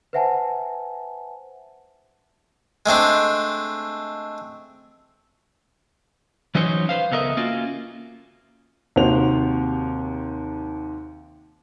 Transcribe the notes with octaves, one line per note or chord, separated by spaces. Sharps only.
B4 C5 E5 F#5 G#5 A5
G#3 A3 C4 D4
E3 F#3 C#4 D#4 C5 C#5
B4 C5 F5
C#2 B3 A4 A#4 D#5 E5
A#3 C#4 F4 F#4
D#2 C3 F#4 C5 F7